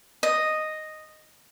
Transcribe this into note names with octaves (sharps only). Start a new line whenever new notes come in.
D#5